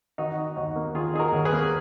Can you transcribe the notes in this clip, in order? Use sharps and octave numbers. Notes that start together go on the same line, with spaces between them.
D#3 D#4 F#4
D#4
D#2 D#4 F#4
A#3
D#3 F4 G#4
D#4 G#4
F#4 A#4
D#2
G#4 B4
A#3